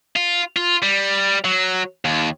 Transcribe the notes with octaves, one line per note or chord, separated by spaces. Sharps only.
F4
F4
G3
F#3
D#2